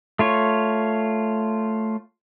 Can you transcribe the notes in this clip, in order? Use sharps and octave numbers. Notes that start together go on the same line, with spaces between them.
A3 F4 C#5